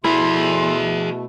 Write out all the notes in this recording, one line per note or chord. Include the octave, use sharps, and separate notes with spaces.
E2 B2 A3 E4 G#4 A4 E5 C6